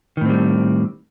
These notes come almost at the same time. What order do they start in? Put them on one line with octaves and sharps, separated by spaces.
D#3 A2 C4 G3